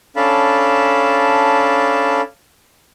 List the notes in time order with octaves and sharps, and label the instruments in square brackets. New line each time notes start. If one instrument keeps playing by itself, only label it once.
[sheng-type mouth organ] C#4 D4 A4 F5 A5 B5